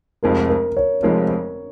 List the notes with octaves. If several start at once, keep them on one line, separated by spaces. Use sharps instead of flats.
F1 F2 F3 G#3 A#4
A#4
C#5
F1 F2 F3 G#3 A#4